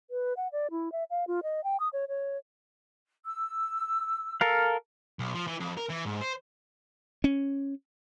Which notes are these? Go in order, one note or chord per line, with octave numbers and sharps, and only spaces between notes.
B4
F#5
D5
E4
E5
F5
F4
D#5
G5
D#6
C#5
C#5
E6
A4 A#4 F5
B1
F3
E3
F2
A#4
E3
G#2
C5
C#4